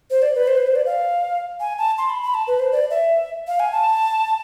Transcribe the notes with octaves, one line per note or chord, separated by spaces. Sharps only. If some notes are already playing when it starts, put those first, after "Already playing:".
C5
D5
B4
C5
B4
C5
D5
F5
G#5
A5
C6
B5
B5
A5
B4
C5
D5
E5
F5
G#5
A5